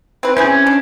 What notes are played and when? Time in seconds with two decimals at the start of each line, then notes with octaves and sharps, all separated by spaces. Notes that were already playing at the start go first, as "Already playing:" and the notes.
0.23 C4 B4
0.37 E3 C4 C#4 G#4 G6
0.67 D4